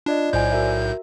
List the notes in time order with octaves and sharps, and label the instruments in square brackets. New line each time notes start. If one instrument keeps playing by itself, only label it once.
[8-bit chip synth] D4 [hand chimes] F4 D5 D#5
[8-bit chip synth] B1 A2 G6 [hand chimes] C5 D5 G#5
[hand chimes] F#4 A#4 E5